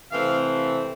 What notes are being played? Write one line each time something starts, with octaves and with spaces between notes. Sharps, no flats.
C3 E3 A3 C4 F5